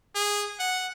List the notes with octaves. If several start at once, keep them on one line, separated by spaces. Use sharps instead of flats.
G#4
F#5